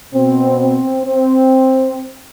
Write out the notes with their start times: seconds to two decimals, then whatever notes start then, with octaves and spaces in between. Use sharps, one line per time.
0.13 B2 C4
0.60 C4
1.05 C4